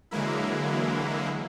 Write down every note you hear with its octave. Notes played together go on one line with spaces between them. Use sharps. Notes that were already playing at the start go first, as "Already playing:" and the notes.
D3 E3 F#3 G#3 A#3 E4